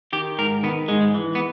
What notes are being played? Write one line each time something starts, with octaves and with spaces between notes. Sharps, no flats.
D#3 G4
G#2 A#4
D#3 B3
G#2 G#3
E3
B3